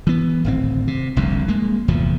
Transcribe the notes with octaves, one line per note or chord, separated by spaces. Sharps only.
E3 B3
D1 G#1 C4
C3
F1 C2 F2 D3
G#3 A#3
F1 E2 A#2 F3